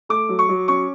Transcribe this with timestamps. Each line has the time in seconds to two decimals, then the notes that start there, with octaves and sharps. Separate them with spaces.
0.09 A3 D6
0.29 F#3
0.39 C#6
0.49 F#3
0.68 C#4 C#6